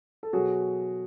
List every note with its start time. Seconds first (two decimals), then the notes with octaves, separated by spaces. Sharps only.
0.23 A4
0.33 B2 F#3 F#4 G#4